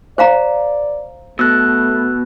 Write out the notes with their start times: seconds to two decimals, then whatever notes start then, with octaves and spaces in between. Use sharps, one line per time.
0.18 C5 D5 F5 A#5
1.39 B2 A3 E6 F#6